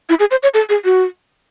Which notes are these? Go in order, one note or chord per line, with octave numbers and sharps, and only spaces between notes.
E4
G#4
C5
C#5
A4
G#4
F#4